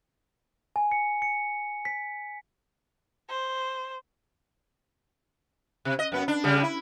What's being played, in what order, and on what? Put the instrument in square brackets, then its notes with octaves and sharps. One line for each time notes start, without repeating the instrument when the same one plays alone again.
[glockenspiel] G#5
C#7
C#7
B6
[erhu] C5
[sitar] C3
D#5
F#2 B3
D4
C#3 G3 G#3
E4